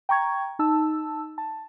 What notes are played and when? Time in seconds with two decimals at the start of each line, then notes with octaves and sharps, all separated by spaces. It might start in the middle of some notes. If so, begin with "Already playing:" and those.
0.09 G5 A#5 C#6 G#6
0.59 D#4 A5 E6
1.38 A5